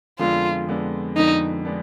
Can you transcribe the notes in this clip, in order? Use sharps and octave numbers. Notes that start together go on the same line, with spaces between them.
F2 D3 G#3 B3 D4 F4
F2 D3 G#3 B3 D4
F2 D3 G#3 B3 D4 D#4
G#3 B3 D4